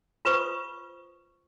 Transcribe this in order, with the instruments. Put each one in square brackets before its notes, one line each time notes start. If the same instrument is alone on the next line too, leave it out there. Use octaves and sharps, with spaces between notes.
[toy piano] F4 B4 C5 C#6 D#6